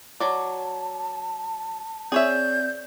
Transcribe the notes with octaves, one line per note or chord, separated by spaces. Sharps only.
F#3 D5 A5
C4 G#4 C#5 D5 E5 G6